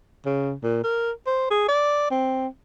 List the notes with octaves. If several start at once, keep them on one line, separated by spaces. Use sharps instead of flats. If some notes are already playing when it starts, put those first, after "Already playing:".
C#3
A#2
A#4
C5
G#4
D5
C4